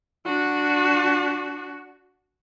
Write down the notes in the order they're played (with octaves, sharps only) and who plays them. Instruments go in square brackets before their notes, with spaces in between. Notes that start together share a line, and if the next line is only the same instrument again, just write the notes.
[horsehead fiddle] D4 F#4